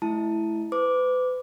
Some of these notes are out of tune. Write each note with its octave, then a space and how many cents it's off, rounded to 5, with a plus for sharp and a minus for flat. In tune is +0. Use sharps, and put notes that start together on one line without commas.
A3 -30 E4 +0 A5 +0
B4 +40 D6 -5